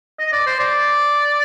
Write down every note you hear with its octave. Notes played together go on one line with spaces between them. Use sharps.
D#5
D5
C5
D5